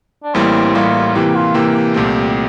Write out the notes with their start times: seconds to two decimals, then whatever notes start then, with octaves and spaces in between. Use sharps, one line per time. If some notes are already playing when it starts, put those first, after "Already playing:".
0.23 D4
0.34 A1 A2 G3 A#3 C4 E4
0.75 A1 A2 G3 A#3 E4 F4
1.15 C3 E3 A#3 G4
1.35 F4
1.54 C3 E3 A#3 G4
1.94 C2 A#2 A3 C4